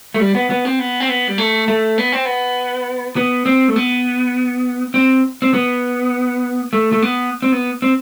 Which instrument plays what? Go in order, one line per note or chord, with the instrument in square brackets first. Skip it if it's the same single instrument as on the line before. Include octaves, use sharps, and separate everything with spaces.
[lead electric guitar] A3
G3
B3
B3
C4
B3
C4
B3
G3
A3
A3
B3
C4
B3
B3
C4
A3
B3
C4
C4
B3
A3
A3
B3
C4
B3
C4